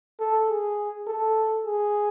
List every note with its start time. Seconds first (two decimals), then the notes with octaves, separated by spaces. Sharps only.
0.20 A4
0.49 G#4
1.07 A4
1.66 G#4